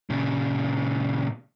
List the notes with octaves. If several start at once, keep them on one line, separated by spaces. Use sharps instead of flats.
A#2 C#3